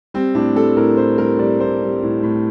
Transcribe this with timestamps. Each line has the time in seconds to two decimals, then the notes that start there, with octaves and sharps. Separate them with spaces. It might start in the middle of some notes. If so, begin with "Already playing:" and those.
0.14 G3 C4
0.35 A2 D4
0.55 G3 A4
0.76 A2 A#4
0.97 A2 C5
1.18 G3 A#4
1.39 G3 D5
1.60 A2 C5
1.81 G3
2.03 A2
2.23 A2